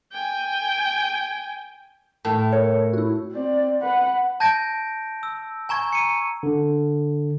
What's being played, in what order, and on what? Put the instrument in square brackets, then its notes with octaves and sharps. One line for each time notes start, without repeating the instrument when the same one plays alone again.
[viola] G5 G#5
[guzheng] A2 [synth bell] A5
[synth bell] A#4 C#5
E4 F#4
[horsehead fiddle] C4 D5
B4 F#5
[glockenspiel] A5 G6 G#6 A#6 D7
E6
G#5 A#5 C#6 G#6
C#7 D#7
[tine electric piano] D3